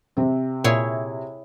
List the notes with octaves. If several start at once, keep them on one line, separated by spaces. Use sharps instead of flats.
C3 C4
A#2 E4 G#4 C#5